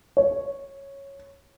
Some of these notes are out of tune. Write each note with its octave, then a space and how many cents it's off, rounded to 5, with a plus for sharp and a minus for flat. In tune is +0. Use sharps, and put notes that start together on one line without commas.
C#5 -5